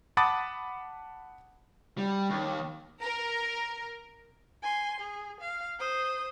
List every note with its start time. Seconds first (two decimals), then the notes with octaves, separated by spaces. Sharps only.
0.17 F#5 A5 B5 D6 D#6 A6
1.98 G3
2.30 D#2
3.02 A#4
4.63 G#5 C6
5.01 G#4
5.41 F5
5.79 C5 D#6